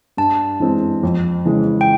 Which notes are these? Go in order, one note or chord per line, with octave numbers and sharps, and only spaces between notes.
G2 A5
E3 G#3 C4
F2
C#3 E3 G#3
G5